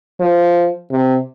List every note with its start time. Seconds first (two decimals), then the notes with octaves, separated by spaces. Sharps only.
0.20 F3
0.91 C3